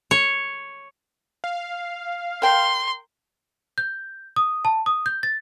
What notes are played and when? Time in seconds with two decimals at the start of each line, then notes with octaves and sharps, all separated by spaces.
0.11 C#5
1.44 F5
2.42 A#4 G5 C6
3.78 G6
4.36 D#6
4.65 A5
4.86 D#6
5.06 G6
5.23 A6